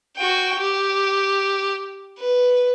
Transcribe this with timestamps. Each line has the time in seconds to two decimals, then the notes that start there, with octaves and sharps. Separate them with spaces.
0.16 F#4 G5
0.59 G4
2.19 B4